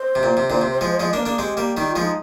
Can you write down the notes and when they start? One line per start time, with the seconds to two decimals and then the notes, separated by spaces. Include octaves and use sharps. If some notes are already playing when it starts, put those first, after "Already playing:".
Already playing: C5
0.15 C3
0.23 A#2
0.37 C3
0.50 A#2 D3
0.62 C3
0.81 F3 G#3
1.00 F3 G#3 D#5
1.10 A#3 D4 D5
1.19 A#4
1.26 A#3 D4 G#4
1.38 G#3 C4 G4
1.57 G3 A#3
1.77 D#3 G3 G4
1.89 F4
1.96 F3 G#3
2.02 D#4